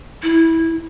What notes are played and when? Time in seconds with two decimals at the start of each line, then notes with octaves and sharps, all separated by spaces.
0.23 E4